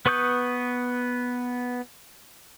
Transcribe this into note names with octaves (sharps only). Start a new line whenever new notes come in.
B3 B4 C#6 D#6 G6